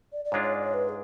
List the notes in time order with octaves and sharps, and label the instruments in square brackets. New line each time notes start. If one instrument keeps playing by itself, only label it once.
[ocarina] D5
D5
[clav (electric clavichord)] G#2 G#3 D4 F4 [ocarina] C#5
[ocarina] C#5
D5
C#5
B4
G#4